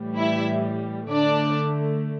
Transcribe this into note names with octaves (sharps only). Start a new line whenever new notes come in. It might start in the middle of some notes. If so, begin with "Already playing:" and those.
Already playing: A2 E3 G3
E4 E5
D3 A3 D4 D5